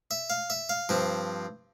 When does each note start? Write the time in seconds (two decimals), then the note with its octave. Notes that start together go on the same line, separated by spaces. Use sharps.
0.11 E5
0.30 F5
0.50 E5
0.69 F5
0.89 G2 F3 C4